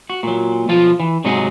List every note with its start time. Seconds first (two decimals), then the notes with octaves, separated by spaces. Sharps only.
0.10 F#4
0.23 A#2 F#3
0.68 B1 F3 F4
1.00 E3
1.24 G#2 C3 F#3 D#4 G#4 F#5